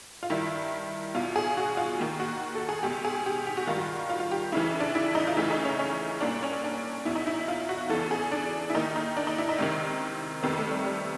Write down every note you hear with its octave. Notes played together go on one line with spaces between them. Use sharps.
F4
G2 D#3 E4
E2 B2 F4
G#4
F#4
F4
D#2 D#3
F#4
A4
G#4
C#2 B2 G4
G#4
G4
G4
F#4
G2 D#3 F4
F#4
F4
F4
G4
F2 C#3 E3 E4
D4
E4
D#4
F4
D2 C#3 E3 E4
D#4
C#4
C#4
C2 A#2 D4
C#4
D4
E2 B2 E4
D#4
E4
F4
F#4
E2 C#3 E3 A4
G#4
D4
E4
D#2 D#3 D#4
D#4
D4
D#4
E4
D#4
C#2 C3 D#3
F2 C3 D#3 B3
A3
G3
G3